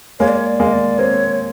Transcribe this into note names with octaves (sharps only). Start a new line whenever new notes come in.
G#3 A#3 C#5
D5
C#5
D5
G#3 A#3
D#5
D5
A#3 C4 C#5